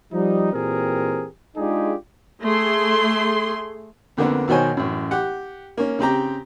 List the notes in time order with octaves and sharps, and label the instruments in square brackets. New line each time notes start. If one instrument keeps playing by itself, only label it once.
[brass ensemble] F3 G3 D#4
A#2 E3 C4 G4 G#4 A#4
G#3 D4 D#4 F4 G4 G#4
[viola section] A3 G#4 C6
[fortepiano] F2 D3 A#3 B3
B1 B2 D#3 C5 C#5 G#5
A1 F#2
G4 F#5
A#3 C#4
C#3 C4 G4 A#5